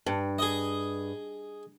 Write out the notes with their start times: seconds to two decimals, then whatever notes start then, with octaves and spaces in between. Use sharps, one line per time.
0.06 G2
0.39 G#4 D#5